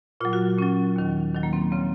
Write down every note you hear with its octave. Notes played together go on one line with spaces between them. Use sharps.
A#2 F#3 F4
F#4
A#2 F#3 C#4
D#2 D#3 F#3
D#2 D#3 F#3
A#3
C4
A#3
C#3 F3 C4